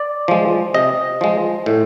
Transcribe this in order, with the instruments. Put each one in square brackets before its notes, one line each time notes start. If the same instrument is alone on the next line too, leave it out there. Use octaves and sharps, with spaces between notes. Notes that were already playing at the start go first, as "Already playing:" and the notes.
Already playing: [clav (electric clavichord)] D5
F3 G#3
C3 D#5
F3 G#3
A2